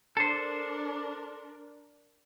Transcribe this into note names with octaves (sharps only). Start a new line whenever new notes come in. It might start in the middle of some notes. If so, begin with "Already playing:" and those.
D4 A4 A#4 C5